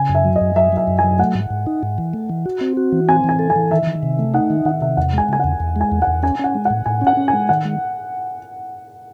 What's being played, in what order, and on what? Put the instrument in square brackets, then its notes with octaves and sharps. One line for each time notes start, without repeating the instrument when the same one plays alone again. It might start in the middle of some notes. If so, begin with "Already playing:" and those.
Already playing: [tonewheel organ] C#3 [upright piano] G#5
[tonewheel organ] F#2
[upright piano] E5
[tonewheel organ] F#3
[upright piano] D#5
[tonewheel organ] F#2
[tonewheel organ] F#3 [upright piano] E5
[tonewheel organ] F#3 [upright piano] E5
[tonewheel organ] F#2
[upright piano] G#5
[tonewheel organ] F#3
[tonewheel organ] A3 [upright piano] F#5
[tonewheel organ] G#2
G#2
D#4
G#2
E3
A3
E3
F#4
C4
F#4
E3
[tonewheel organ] C4 [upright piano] G#5
[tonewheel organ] E3 [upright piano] G#5
[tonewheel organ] A4
[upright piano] G#5
[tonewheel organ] E3
[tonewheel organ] D#3 [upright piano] E5
[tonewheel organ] D#3
C3
A3
[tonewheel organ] D#4 [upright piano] F#5
[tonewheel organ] D#3
[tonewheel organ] D#3 [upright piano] F#5
[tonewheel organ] C3 [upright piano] E5
[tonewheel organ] E2 [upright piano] F#5
[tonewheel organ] G#3 [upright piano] G#5
[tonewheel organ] C#3 [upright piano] G#5
[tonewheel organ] E2 [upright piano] F#5
[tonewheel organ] E2
[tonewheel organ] G#3 [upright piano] G#5
[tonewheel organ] E2
[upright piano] F#5
[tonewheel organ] E2
[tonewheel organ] C#4 [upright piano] G#5
[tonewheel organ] C#4 [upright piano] F#5
[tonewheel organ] G#3
[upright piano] F#5
[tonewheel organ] A2
[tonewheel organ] A2 [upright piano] G#5
[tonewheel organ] C#4
[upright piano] F#5
[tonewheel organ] C#4
[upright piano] G#5
[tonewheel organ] G#3
[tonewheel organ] D#3 [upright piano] F#5
[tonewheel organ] G#3